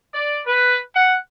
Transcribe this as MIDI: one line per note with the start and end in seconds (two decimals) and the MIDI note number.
0.15 0.41 74
0.46 0.78 71
0.95 1.15 78